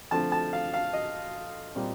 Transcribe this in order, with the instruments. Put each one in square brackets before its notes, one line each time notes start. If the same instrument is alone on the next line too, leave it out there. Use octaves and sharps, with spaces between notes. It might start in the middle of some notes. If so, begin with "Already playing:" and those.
[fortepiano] D3 F3 A3 C4 A5
A5
F5
F5
D#5
A#2 G3 C4